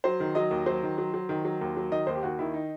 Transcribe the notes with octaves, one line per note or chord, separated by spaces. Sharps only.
F#3 C5
D#3
F#3 D#5
D#2
F#3 C5
D#3
F#3
F#3
D#3
F#3
D#2
F#3
D#3 D#5
D#2 C5
G4
D#2 F#4
D#3 E4
D#4